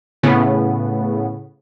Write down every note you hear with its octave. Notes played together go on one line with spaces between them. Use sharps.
A2 C#3 B3